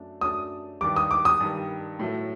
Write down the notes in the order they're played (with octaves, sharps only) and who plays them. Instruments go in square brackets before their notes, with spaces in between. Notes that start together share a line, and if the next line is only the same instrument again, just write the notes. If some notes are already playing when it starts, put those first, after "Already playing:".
Already playing: [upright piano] F#2 F#3 A3 D4
[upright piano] F#2 F#3 A3 D4 [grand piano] D#6
[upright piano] G2 D#3 G3 [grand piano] D6
[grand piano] D#6
D6
D#6
[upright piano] G2 D#3 G3
A2 F#3 A3